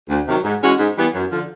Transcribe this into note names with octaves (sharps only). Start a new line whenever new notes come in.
D2
C3 D#3 F#3
G#2
E3 G#3 C#4 F#4
G#2
E3 G3 B3
F#2
D3 F3